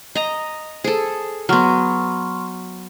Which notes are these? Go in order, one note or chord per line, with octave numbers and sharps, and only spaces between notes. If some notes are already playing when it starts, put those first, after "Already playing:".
D#5 A#5
G#4 A4 C5
F#3 B3 C6 C#6 F6